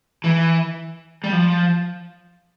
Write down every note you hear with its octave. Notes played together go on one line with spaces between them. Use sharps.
E3
G3
F3